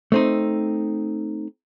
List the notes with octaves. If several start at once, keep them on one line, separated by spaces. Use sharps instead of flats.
A3 C4 D#4